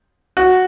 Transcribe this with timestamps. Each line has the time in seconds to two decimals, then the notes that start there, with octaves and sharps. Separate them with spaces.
0.37 F#4